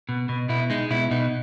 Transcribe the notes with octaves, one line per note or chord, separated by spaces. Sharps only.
B2
B2
B2 E4
G#3 D#4
B2 E4
B2 D#4